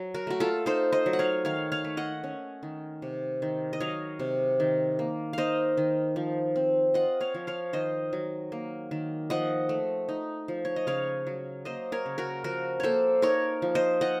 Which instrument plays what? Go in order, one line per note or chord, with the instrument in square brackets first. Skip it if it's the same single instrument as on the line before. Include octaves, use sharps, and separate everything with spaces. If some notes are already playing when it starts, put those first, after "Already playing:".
Already playing: [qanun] F#3
F#4 A#4
A3 F#4
F4 A4
D#4 A4 C5
C5 D#5
F#3
F#5
C#5 F5
D#3 C#5 F5
C#5 F5
A3
D#5 F#5
C#4
D#3
C3
D#3
D#5
F#3 C#5 F5
C3
D#3
A#3
D#4 C5 D#5 F5
D#3
F3
C4
F4 D#5 F#5
C#5 F5
F3
C#5 F5
D#3 C5 D#5
F#3
A#3
D#3
F3 D#5 F#5
A3
D#4
F3
C#5
D#5
C#3 C#5 F5
F#3
A#3 C5 D#5
A#4 C#5
C#3
F#4 A#4
F3 F#4 A#4
A#3 A4 C5 C#5
D#4 A#4 C#5
F3
C5 D#5
F4 D#5 F#5